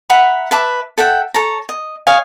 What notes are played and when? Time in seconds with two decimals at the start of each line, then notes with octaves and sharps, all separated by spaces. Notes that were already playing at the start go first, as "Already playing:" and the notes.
0.10 E5 F#5 A#5 B5
0.51 B4 E5 A5 D6
0.98 A4 E5 F#5 G5
1.34 A4 C#5 A5 A#5
1.69 D#5
2.07 C#5 D#5 F5 G#5